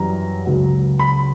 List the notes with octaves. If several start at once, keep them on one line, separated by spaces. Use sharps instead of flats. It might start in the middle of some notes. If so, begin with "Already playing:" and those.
Already playing: F#2 E3 G3 A#5
C#2 C#3 F#3
B5